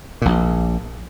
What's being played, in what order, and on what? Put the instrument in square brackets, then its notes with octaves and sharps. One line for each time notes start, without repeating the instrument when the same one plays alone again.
[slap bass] A#1 A#2